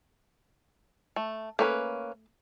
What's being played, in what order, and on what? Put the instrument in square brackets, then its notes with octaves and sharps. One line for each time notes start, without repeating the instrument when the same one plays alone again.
[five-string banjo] A3
[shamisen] A3 [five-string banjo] A#3 C#4 B4